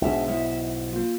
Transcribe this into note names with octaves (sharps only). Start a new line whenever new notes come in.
B1 G#2 G#3 D4 G#4 E5
F#3 E4
A#3 F4